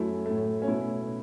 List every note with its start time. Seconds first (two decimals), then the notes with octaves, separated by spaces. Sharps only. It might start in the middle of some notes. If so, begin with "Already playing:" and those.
Already playing: F#2 F#3 A3 E4
0.26 A2 A3
0.62 C#4
0.68 B2 A3 E4